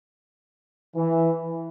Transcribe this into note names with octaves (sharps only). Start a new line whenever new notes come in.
E3